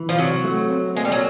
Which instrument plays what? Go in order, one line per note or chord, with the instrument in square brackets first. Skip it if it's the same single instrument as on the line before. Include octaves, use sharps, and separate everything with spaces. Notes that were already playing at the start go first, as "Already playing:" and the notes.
Already playing: [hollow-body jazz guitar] E3
[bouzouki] F3
[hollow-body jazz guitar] C3 [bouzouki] F#3
[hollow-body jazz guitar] A3
C4
[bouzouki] G#3 [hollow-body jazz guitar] A#3
[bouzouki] G3
F#3